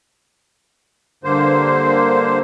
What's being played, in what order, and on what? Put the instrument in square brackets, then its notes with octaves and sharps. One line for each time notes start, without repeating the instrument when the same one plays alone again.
[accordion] G2 D3 A#3 C5